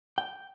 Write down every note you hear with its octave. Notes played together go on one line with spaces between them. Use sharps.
G5